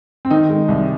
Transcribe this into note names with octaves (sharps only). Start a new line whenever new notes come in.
C4
D#3 D#4
G#3
C2